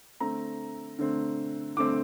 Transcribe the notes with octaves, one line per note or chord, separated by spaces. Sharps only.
D3 A3 C4 A#5
D3 A3 C4
D3 A3 C4 D6